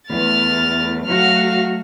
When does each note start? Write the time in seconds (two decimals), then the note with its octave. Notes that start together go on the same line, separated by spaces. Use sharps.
0.10 E2 A3 F6 A6
1.06 F#3 A3 F#4 F5 F6